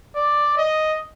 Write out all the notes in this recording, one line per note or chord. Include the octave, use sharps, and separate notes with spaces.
D5
D#5